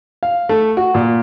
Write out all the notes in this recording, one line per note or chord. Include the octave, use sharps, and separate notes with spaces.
F5
A3
F#4
A#2